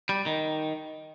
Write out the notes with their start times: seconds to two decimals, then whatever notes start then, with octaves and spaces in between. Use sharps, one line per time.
0.09 G3
0.26 D#3